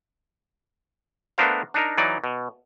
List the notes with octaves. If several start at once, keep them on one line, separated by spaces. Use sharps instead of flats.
A3 B3 D4 A#4 C5 F5
D4 D#4 A#4
E3 F#3 D#4 D5
B2